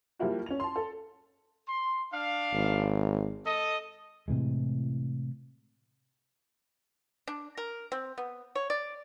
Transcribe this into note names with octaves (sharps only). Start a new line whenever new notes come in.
F3 G3 A#3 E4 F#4
C#4 F7
A5 C6
A4
C6
D4 F5
G#1
A4 D#5
A2 C3 E3 G#3
D4
A#4
C4
B3
C#5
D5